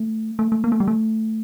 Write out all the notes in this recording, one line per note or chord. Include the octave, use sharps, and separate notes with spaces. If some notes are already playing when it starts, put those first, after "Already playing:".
Already playing: A3
A3
A3
A#3
A3
G3
A3